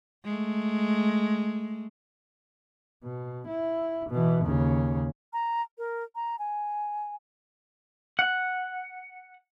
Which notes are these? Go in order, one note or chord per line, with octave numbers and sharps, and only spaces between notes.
G#3 A3
B2
E4
B2 E3
D#2 C#3
A#5
A#4
A#5
G#5
F#5